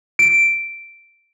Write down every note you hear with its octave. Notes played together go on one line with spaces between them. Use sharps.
D7